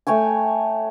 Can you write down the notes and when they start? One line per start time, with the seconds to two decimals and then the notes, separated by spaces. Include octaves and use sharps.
0.07 A3 C#5 G5 G#5